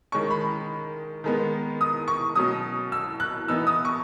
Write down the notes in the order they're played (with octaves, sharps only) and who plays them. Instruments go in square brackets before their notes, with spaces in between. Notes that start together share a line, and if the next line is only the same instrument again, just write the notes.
[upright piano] D#3 G#3 C#4 C#6
B5
D#3 G#3 B3
D#6
C#6
B2 F#3 C#4 D#6
E6
F#6
E3 B3 D#4 E6
D#6
C#6